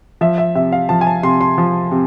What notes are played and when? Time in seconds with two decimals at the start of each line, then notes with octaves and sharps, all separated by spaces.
0.21 F3 E5
0.38 E5
0.55 C3 E5
0.72 F5
0.89 F3 A5
1.01 G#5
1.07 A5
1.23 C3 C6
1.41 C6
1.58 F3
1.92 C3